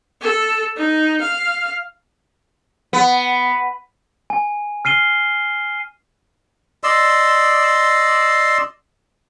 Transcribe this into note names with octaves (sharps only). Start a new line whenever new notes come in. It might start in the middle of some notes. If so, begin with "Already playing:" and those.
A4
D#4
F5
B3
G#5
F6 C7 D#7 G7
D5 D#5 C6 E6